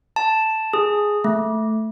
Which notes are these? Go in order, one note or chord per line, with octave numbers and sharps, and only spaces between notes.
A5
G#4
A3